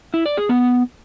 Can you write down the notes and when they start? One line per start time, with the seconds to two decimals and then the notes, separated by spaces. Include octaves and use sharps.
0.14 E4
0.26 D5
0.37 G#4
0.49 B3